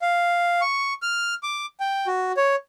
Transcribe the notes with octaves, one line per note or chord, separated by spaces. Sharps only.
F5
C#6
F6
D6
G5
F#4
C#5